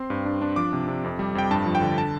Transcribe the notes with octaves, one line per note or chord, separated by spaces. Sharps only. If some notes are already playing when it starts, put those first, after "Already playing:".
Already playing: C4 C6
G2
D4
D4
F3 D6
C3
C3
F2
G3
F2 G5
G2 A5
F3
G5
D3
A5